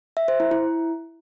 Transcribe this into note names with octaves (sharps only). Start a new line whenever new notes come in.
E5
C5
E4
E4